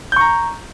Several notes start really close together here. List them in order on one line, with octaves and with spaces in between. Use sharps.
G6 C#6 A#5